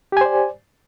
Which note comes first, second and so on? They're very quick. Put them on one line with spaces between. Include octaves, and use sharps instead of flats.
G4 G#5 C5 D5